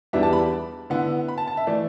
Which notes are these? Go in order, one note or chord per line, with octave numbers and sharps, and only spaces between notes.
E2 E3 G3 B3 D4 E5
A5
B5
D3 B3 E4
B5
A5
A5
E5
E3 A3 D5